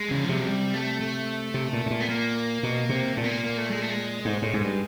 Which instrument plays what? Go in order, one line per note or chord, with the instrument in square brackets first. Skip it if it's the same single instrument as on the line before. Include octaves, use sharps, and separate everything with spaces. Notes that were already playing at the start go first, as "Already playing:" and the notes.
Already playing: [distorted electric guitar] G#3
[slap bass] C#3 [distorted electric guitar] E3
[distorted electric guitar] F3
[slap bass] C3
[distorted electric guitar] F#3
G3
A3
A3
[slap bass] C3
A#2
A2
A#2
[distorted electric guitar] B3
A#3
[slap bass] B2
C3
[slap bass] A#2 [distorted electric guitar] A3
[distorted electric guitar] B3
A#3
A#3
A3
G#3
A3
G#3
[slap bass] G#2
A2
G#2
G2